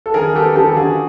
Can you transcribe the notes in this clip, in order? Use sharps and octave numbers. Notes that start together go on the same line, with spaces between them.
A4
D#3 G#4 A#4
B3 G4 A4
D#3 G4 A4
A4
D3 F#4 G#4